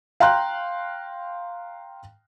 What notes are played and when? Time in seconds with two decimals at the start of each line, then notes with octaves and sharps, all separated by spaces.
0.20 F5 G5 A#5 C6 F#6